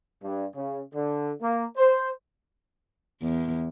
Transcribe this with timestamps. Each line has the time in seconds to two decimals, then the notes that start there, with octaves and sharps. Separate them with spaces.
0.23 G2
0.55 C#3
0.94 D3
1.42 A#3
1.77 C5
3.22 E2